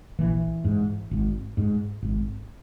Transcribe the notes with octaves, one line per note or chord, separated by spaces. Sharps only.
A#1 E3
G#2
G#1
G#2
G#1